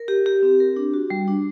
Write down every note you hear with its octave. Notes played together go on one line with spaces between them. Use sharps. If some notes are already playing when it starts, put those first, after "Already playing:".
Already playing: A#4
G4
G4
C4
A#4
D4
F#4
G3
D4